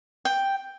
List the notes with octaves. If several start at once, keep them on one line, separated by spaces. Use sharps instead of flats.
G5